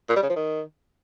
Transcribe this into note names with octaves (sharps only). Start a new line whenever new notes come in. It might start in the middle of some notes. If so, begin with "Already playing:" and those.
A#2
G3
C#3
F3
D#3